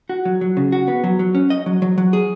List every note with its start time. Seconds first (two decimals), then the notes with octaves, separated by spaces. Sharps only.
0.09 F#4
0.25 F#3
0.41 F#3
0.57 C#3
0.72 F#4
0.88 B3
1.04 F#3
1.19 F#3
1.35 C#4
1.50 D#5
1.66 F#3
1.82 F#3
1.98 F#3
2.13 G#4